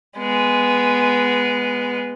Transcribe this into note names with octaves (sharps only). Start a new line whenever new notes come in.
G#3 B3